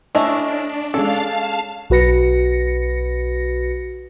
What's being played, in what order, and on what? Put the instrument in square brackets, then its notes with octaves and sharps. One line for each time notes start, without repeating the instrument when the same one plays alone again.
[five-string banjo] A3 C#4 E4 [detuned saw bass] D4 [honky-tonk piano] D#5
[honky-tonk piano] G#3 C#4 [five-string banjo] A4 [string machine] F5 A5
[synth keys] B1 F#4 B4 A#6 C#7